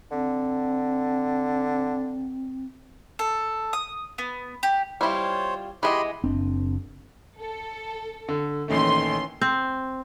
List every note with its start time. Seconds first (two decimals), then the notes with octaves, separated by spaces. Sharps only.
0.12 D3 C4
3.19 A4
3.73 D#6
4.18 B3
4.63 G4
5.01 G3 C4 E4 F4 C5 C#5
5.83 E3 G#3 A3 B3 G4 D#5 B5 C6
6.24 F#1 C4 D4
7.38 A4
8.29 D3
8.68 A#1 D#3 E3 A3 C#4 C6
9.42 C4